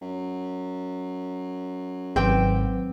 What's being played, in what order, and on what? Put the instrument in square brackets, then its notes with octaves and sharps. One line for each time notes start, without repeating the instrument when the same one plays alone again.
[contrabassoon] F#2
[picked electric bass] G#1 [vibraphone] F#3 B4 D6 [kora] C4 G5